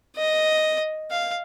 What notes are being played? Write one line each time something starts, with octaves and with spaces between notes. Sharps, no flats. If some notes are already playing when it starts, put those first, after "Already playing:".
D#5
F5